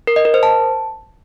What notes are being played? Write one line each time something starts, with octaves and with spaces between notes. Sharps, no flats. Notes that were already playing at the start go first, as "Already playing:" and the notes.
A#4
D#5
A#4
C5
A5